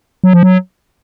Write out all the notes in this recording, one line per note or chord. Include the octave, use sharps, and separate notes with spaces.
F#3
F3
F#3